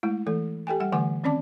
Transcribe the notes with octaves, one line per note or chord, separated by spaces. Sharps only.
G#3 A3 E4
E3 A3 A4
G4 A4 G5 G#5
G3 F#5
D3 E3 A3 F#5 G#5 D6
D#3 C4 C#4 D5 A5 D6